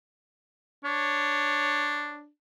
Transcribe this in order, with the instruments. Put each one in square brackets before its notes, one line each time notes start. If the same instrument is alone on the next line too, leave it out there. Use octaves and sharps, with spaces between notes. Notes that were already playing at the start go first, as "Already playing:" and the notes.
[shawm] D4 [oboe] C#5